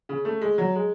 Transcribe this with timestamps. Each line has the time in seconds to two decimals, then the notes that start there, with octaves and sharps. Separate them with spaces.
0.09 C#3
0.25 A3
0.41 G#3
0.58 F#3
0.75 G#3